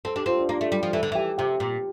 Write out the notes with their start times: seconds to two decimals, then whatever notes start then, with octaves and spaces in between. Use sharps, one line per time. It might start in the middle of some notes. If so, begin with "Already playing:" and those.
0.05 C4 A4
0.16 D4 G4
0.26 C4 F4
0.38 D4
0.49 A#3 D4
0.61 A3
0.72 G3
0.83 F3
0.93 E3 A4
1.03 D3
1.12 E3 G4
1.38 C3 G4
1.60 A#2